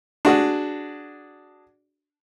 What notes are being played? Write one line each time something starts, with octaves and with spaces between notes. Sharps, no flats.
D4 F#4 G#4